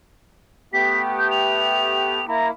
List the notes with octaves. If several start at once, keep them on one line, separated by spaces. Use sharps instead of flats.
A3 B3 G4 B6
G6
F7
A#3 E4 A#5